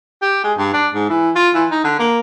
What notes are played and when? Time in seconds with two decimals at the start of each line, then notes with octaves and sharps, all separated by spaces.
0.22 G4
0.44 G#3
0.58 G2
0.74 D4
0.94 G#2
1.10 E3
1.36 F4
1.55 E3
1.71 D#4
1.84 D3
1.99 A#3